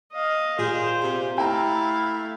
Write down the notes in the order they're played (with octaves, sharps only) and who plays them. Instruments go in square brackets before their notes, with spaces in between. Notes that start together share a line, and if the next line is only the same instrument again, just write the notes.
[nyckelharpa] D#5 F5
[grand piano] A#2 [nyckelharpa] G4 C5 [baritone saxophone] G#4
[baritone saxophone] C3
[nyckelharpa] A3 F5 [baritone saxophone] E4 [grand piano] G5 A#5